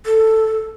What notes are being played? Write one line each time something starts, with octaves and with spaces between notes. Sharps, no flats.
A4